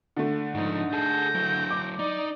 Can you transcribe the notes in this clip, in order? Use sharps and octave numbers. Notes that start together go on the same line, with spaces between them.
D3 A3
G#2 F3 D#4
G#4 A4 G6 A#6
F#3 E4
D6
D#4 D5